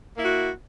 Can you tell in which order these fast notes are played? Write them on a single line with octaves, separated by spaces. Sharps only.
A#3 E4 F#4